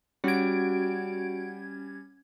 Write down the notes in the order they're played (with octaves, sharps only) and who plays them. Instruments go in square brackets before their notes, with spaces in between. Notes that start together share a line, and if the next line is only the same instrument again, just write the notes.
[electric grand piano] G3 [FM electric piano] C#4 G#6 [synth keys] F#4 D7